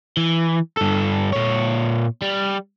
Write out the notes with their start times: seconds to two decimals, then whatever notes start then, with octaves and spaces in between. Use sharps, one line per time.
0.17 E3
0.77 G2 A4
1.32 A#2 C#5
2.22 G3